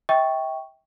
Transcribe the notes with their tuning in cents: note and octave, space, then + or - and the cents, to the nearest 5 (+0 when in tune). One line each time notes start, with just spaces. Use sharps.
E5 -40 G5 +0 C#6 +0